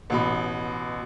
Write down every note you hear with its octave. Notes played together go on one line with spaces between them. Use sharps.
A1 B2 B5